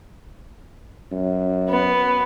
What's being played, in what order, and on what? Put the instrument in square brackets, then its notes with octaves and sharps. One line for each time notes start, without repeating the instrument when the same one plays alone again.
[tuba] F#2
[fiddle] B3